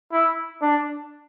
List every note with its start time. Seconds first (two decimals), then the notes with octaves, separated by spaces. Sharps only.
0.12 E4
0.61 D4